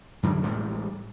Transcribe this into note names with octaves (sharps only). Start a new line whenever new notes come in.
F#2 D3 F#3 G3
A1 A2 G3 G#3